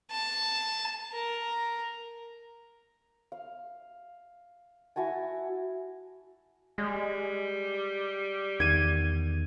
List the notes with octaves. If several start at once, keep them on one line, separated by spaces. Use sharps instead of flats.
A5
A#4
F5
E4 F#4 G#5 A5
G3 G#3
E2 D#3 G#6 D#7